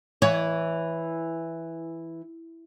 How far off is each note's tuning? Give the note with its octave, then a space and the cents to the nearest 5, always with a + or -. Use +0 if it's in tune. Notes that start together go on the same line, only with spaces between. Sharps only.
E3 +0 C#5 +15